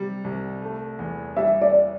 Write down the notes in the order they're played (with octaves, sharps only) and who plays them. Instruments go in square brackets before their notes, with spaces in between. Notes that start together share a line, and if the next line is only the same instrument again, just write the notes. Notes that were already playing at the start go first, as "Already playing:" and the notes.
Already playing: [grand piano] C3 G3
C2
A3
E2
[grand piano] G3 [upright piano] E5
[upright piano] D5